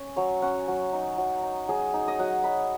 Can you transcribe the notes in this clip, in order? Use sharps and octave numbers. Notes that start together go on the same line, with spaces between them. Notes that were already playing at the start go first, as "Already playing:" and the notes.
Already playing: C#4
F#3 C#5
C#4 F#5
F#3
D#4
F#3
D#4
F#3 G#4
D#4
D#5
F#3 F#5
D#4 B5